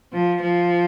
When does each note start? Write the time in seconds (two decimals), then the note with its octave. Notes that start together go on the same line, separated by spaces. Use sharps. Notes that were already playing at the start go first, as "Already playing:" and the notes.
0.12 F3
0.42 F3